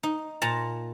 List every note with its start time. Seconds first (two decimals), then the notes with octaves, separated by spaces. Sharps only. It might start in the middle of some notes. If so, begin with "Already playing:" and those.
0.03 D#4
0.42 A#2 A5 A#5